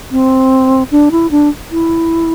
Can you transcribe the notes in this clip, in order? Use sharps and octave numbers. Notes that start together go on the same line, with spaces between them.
C4
D4
E4
D4
E4